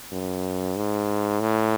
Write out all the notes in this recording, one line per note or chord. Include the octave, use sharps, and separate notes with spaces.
F#2
G#2
A2